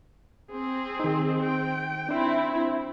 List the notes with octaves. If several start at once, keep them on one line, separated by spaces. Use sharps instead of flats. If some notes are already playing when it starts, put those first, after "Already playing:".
C4 G#4
D#3 D#4
G5
C4 D4 E4 C5